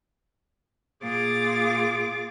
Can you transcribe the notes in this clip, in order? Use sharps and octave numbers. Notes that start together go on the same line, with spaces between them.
A#2 F4 G#4 D6 A6